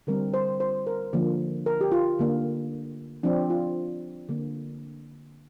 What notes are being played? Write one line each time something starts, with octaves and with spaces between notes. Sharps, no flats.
D3 G3 C4 A#4
C5
C5
A#4
D3 F3 A#3
A#4
G4
F4
D3 A#3
F3 C4 D4
F4
D3 A#3